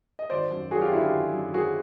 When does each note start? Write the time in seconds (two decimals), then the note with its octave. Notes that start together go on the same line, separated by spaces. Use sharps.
0.19 D#5
0.30 G#1 C5 D5
0.51 F#2
0.71 F#3 F#4 G#4
0.81 F4 G4
0.92 D3 E4 F#4
1.03 F4 G4
1.13 G#1
1.33 F#2
1.54 F#3 F#4 G#4